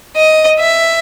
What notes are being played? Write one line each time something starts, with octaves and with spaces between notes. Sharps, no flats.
D#5
E5